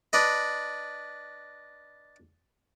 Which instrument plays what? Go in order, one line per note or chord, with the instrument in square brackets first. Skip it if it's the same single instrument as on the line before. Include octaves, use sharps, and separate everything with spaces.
[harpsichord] D4 B4 D#5